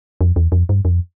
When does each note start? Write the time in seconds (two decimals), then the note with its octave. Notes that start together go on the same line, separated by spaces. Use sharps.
0.21 F2
0.36 E2
0.52 F2
0.69 G2
0.85 F2